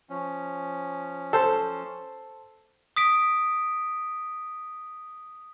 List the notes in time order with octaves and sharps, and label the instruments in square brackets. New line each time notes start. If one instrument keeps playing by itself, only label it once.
[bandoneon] F3 C#4
[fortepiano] A4 C5
[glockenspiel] D#6 B6 D7